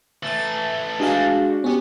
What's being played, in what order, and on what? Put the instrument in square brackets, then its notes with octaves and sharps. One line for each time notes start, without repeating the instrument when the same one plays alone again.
[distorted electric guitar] E3 A3 [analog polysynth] A6
[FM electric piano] G#3 G#4 F5 [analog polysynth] D4 F#4
[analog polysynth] B3 [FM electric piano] C#4 G4